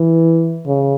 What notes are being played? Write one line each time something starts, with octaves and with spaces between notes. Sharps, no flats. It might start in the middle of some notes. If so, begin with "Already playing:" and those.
Already playing: E3
C#3